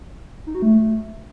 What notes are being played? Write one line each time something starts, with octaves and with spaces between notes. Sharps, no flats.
D#4
F#4
A3